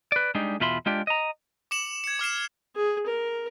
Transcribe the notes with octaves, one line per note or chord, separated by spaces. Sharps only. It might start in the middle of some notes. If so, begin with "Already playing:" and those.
B4 D5
G3 G#3 D4 D#4
E2 B2 F4 E5 B5 C6
G#3 D4 F4 G4 D5
D#5 A#5
D6 C#7 E7 F#7
G#6 C#7
D6 F6 C7 E7
G#4
A#4